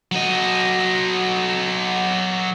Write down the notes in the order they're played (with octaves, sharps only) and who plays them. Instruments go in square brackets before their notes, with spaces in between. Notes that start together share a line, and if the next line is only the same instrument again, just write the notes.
[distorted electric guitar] F#3 D#5